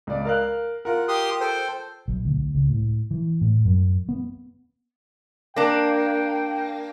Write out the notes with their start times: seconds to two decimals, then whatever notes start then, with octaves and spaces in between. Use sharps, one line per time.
0.07 C#2 D5
0.25 A#4 F5 F#6
0.85 F4 A#4 F#5
1.08 G4 C6 D#6
1.41 A4 C5 G5
2.08 B1
2.25 D2
2.55 C#2
2.69 A2
3.11 E3
3.41 A2
3.65 F#2
4.09 B3
5.56 A#3 D4 G5